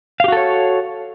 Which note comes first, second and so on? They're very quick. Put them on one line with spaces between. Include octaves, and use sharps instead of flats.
F5 G4 F#4 A4 C#5